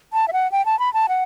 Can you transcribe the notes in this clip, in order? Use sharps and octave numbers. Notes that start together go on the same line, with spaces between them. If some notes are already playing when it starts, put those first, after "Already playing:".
A5
E5
F#5
G5
A5
B5
A5
F#5